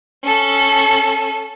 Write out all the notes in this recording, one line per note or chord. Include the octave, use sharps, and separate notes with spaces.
C#4 A4